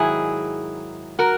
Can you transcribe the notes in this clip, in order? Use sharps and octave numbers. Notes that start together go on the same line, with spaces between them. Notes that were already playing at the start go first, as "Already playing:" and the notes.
Already playing: G#2 D#3 F#3 E4 G#4
F#4 A#4